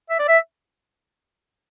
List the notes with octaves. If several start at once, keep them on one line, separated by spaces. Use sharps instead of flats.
E5
D5
E5